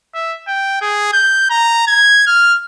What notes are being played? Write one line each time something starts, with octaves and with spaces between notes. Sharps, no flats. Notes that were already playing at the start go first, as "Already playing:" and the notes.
E5
G5
G#4
G6
A#5
G#6
F6